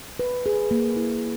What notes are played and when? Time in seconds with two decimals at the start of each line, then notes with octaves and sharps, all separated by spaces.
0.19 B4
0.46 G#4
0.71 A#3
0.96 E4